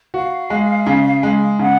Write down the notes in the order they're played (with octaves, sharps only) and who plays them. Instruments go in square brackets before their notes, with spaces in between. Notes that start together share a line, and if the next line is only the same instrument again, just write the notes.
[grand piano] F#4 [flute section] F5
[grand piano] G#3
C#3
G#3
[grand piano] C#3 [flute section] F#5